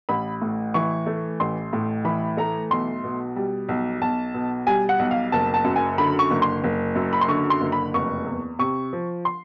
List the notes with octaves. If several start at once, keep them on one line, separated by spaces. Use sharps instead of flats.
A1 B5
A2
E3 C#6
A3
A1 C6
A2
E3 B5
A3 A#5
B1 C6
B2
G3
B1
B1 A5
B2
G3 G#5
F#5
B1
F5
F#1 A5
A5
F#2
G#5
D3 B5
C#6
F#1
C6
F#1
F#2
B5
C6
D3 C#6
C6
F#1
B5
F1 C#6
E2
C3 C#6
F3
C6